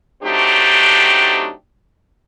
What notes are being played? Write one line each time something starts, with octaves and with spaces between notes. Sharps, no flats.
F#3 A3 C4 D4 D#4 G4